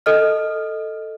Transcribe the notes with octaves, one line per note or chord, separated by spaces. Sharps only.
A4 D#5 F6